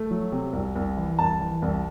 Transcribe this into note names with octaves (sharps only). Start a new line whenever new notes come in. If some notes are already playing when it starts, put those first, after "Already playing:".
Already playing: A3
F#3
C3
C2
C2
E3
C2 A5
E3
C2